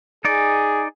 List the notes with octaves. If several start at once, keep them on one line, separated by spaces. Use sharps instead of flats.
D#4 G#4 D5